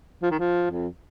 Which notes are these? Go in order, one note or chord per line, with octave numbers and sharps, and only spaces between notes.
F3
D#3
F3
F2